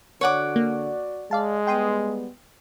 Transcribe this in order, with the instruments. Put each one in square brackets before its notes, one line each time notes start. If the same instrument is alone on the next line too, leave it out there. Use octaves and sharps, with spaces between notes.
[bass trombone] D3 [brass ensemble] F#4 D5 [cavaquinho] C#5 F#5 D6
[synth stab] A#3
[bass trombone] G#3 [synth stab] D5 F5 A5
[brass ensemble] G3 B3 [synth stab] G5 C6 D#6